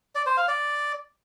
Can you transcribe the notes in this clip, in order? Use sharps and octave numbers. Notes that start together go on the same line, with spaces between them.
D5
C5
F5
D5